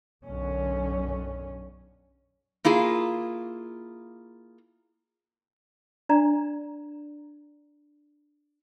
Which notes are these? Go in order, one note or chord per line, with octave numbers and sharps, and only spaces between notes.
B1 F#2 D3 C#4
A#3 E4 F4 G#4
D4 D5 A#5